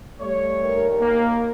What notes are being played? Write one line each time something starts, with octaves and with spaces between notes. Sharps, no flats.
G3 A3 C#5
D#2 A#4
A#3